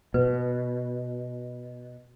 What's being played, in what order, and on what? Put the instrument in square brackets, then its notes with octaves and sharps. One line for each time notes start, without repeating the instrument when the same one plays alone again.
[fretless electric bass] B2 [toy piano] B4